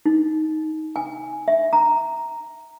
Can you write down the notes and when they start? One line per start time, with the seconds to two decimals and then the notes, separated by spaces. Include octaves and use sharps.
0.06 D#4
0.96 G#5
1.48 E5
1.73 A#5